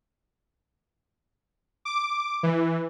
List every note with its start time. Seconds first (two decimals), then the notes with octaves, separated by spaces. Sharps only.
1.85 D6
2.43 E3